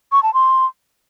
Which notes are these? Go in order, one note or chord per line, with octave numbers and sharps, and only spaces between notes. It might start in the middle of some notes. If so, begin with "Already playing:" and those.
C#6
A5
C6